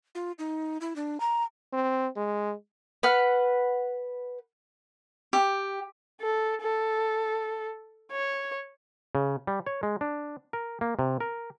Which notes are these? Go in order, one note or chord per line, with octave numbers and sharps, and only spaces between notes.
F4
D#4
E4
D4
A#5
C4
G#3
B4 F#5 F6
G4
A4
A4
C#5
C#3
G3
C#5
G#3
D4
A#4
A#3
C3
A#4